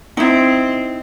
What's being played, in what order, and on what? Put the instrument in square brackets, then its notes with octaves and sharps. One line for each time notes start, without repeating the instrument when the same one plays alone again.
[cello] C4 [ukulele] D#4 E4